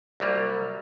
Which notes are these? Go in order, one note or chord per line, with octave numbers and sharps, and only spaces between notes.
C2 F#3 G3 A#3